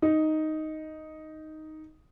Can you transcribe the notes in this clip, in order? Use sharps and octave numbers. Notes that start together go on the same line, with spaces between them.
D#4